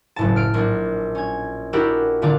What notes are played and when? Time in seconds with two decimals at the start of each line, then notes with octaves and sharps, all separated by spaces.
0.16 F#1 A2 A5
0.36 F6 D7
0.54 A#1 D4
1.15 C#4 G#6
1.73 D4 E4 F#4 G4 A#4
2.22 A#2 D3 D4 F4 D5